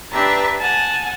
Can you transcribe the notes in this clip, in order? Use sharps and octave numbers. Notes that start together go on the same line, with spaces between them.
D4 G4 B4 E5 A5 A#5
F#5 G#5 A5